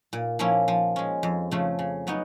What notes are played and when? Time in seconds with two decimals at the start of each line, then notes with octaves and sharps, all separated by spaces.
0.13 A#2
0.39 F3 A#3 C#4 E4
0.68 F3
0.96 G#3 C#4
1.23 F2
1.51 C#3 F3 A3 C#4
1.79 C#3
2.07 F#3 B3 D#4